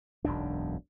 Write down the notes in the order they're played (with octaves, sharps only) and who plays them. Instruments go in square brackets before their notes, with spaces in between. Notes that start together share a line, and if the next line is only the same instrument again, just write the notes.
[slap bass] E1 B1 F#2 D4